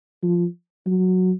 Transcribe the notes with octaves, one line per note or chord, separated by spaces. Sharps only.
F3
F#3